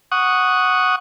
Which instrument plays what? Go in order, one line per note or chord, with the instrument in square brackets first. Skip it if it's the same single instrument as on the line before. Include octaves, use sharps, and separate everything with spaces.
[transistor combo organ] F#5 C#6 D#6